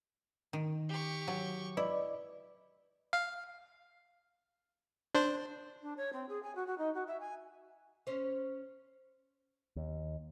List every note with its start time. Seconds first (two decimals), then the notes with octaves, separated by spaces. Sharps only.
0.53 D#3
0.89 G4 C#6
1.28 F#3
1.77 E4 B4 D5 D#5
3.13 F5
5.15 D4 C5
5.82 D4
5.97 C#5
6.12 C4
6.28 G#4
6.43 G#5
6.55 F#4
6.66 F#4
6.78 D#4
6.94 F#4
7.07 E5
7.20 G#5
8.07 C#4 C5
9.76 D#2